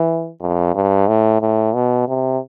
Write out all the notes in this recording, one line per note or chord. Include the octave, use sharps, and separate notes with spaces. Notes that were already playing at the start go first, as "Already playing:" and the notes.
Already playing: E3
F2
G2
A2
A2
B2
C3